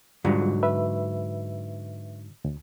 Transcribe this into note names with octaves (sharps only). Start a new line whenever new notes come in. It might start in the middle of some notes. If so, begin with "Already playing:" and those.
G#2 D3 F#3 G3 F4
B4 E5
D2